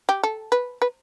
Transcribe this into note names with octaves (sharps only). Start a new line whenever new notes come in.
G4
A4
B4
B4